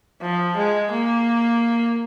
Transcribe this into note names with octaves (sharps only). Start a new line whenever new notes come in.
F3
G#3
A#3